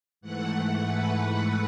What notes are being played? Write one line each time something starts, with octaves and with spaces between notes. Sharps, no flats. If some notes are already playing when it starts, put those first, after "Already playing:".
G#2 E3 A3 F#5
F#5
B4